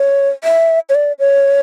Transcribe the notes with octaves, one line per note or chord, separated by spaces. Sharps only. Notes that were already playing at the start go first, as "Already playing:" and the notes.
Already playing: C#5
E5
C#5
D5
C#5